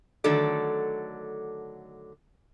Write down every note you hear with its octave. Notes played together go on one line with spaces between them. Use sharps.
D3 D#3 F#3 A3 A4 D5